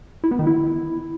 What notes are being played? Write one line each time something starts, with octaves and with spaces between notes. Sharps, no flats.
E4
B3
D#3
E4